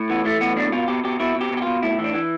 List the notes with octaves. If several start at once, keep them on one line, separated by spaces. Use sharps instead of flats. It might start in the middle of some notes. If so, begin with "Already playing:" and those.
Already playing: A2
E3 B3
E3 A3
A2 B3
B2 D4
B2 F4
B2 G4
B2 G4
B2 E4
B2
G4
B2
G4
F4
B2
A2 E4
E3
D4
E3